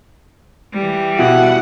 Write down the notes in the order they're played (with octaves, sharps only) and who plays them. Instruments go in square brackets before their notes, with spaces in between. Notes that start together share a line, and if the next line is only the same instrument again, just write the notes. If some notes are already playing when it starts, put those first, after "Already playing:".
[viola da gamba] E3 G3
[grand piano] B2 E4 [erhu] F#5